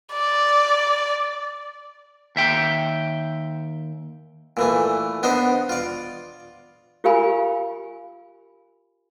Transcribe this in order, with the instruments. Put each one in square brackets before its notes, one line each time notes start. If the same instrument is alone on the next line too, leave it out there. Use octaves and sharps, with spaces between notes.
[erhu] D5
[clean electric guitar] D#2 E5 G5
[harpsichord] A#2 E3 A3
B3 D4 D#4 C5 D#5
F4 D5
[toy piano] F4 G4 A#4 F5 G#5 B5